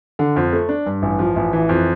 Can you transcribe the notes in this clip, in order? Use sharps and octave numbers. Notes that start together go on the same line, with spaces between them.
D3
F2
A3
D4
G2
A1
F3
A1
E3
F2